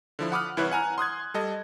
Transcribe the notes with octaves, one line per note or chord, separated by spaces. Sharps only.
D3 F3 E4
F#5 B5 D6 D#6 F6 F#6
C2 E3 E4 B4 C#5 F#6
F#5 G#5 A#5 F6
C6 D#6 F#6 G#6
G3 A4 D#5